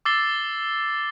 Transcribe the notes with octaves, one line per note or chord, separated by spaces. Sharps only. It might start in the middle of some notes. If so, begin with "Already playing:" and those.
D6 E6 A6 C7 G7